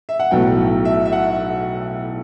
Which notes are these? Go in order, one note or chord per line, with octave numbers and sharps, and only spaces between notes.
E5
F#5
B1 A2 F#3 B3 G5
E5
E5
F#5